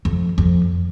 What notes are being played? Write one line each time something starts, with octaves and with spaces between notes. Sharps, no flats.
F2
F2